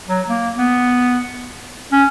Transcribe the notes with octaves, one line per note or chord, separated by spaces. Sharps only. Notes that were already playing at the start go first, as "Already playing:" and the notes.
F#3
A#3
B3
C#4